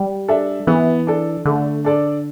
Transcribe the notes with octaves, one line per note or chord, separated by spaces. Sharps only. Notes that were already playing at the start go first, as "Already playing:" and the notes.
Already playing: G3
D4 A4 E5
E3 B3
D4 A4
D3 A3
D4 A4 D5